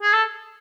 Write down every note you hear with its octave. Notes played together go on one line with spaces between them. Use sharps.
G#4
A4